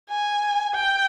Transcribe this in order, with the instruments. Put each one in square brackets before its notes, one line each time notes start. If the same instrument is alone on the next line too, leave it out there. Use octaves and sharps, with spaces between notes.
[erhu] G#5
G5